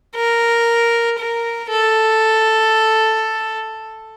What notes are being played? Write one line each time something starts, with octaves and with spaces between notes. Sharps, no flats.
A#4
A#4
A4